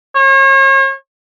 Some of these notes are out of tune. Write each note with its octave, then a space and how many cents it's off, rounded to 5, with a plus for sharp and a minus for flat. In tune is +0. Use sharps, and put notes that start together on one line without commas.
C#5 -40